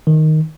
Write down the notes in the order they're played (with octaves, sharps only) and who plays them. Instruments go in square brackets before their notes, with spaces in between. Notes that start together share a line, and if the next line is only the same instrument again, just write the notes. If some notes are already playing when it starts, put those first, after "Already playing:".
[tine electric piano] D#3